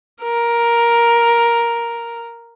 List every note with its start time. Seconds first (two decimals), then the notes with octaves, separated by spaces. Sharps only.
0.22 A#4